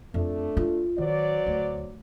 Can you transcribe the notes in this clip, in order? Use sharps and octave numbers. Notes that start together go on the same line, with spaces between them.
F2 A3 D4
F4
D#3 F#3 C5 D5
D2